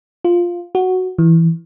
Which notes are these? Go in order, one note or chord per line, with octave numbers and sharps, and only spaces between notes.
F4
F#4
E3